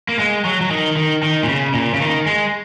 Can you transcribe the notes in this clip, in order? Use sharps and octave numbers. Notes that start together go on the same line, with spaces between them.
A#3
G#3
F#3
F#3
D#3
D#3
D#3
A#2
C#3
A#2
C#3
D#3
G#3